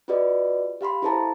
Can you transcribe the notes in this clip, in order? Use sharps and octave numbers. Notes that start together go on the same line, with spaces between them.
F4 F#4 G#4 B4 D5 D#5
G4 F5 B5 C6
E4 G#4 A4 C5 A5 A#5